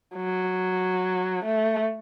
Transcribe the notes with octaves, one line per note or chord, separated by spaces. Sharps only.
F#3
A3